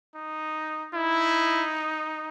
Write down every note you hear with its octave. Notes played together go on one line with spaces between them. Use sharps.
D#4
D#4 E4